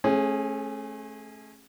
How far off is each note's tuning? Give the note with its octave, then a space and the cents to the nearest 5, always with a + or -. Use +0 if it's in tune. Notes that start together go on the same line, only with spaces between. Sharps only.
A3 -25 C#4 -35 G#4 +0